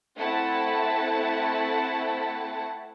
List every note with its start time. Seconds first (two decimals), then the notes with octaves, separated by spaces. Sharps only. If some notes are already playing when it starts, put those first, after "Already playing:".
0.18 A3 C4 E4 F#5 A5